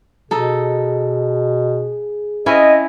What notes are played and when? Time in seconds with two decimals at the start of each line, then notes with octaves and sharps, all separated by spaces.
0.31 B2 D#4 G#4 A4
2.46 C4 C#4 E4 D#5